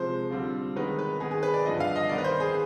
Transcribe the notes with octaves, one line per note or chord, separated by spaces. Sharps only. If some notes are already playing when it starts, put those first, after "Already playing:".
Already playing: C3 F3 G#3 C5
D3 G3 C4 F4
D#3 G#3 B3 D#4 B4
B4
D#3 B3 D#4 G#4
G#4
B4
D5
G2 D3 F3 D#5
F5
D#5
D#3 B3 D#4 D5
B4
C5
G#4